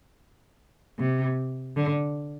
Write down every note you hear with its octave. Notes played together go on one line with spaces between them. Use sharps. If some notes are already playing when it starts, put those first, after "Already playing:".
C3
D3